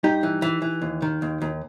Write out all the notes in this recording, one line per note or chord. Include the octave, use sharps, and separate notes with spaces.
G2 D#4 G4
E3
E3
E3
D#2
D#3
D#2
D#2